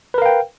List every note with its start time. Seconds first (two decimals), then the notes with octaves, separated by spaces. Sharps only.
0.14 B4
0.18 A#4
0.22 F5
0.26 G5